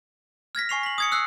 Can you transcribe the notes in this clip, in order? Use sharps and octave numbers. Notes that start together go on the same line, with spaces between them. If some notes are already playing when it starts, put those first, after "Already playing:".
F6 G#6 A#6 B6
G#5 C#6 C7 F7
B6 F#7
D#6 G#6 C#7
E6 F#6 C7